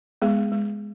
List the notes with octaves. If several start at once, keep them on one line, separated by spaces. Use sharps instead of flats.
G#3 B3 G#4
G#3